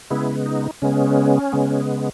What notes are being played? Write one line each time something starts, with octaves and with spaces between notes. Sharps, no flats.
C#3 G#3 B3 E4
D#4
C#3 G#3 B3 C#4
C#3 G#3 B3